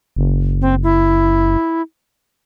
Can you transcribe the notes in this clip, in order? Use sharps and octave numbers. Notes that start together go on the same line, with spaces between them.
F#1
C4
E4